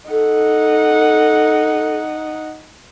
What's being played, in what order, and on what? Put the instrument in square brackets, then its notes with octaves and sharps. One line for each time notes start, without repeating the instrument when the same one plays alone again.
[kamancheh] D#4 F#5 [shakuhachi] A4